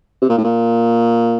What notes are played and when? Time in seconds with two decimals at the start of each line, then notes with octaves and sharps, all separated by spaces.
0.22 C3
0.29 A#2
0.38 A2
0.44 A#2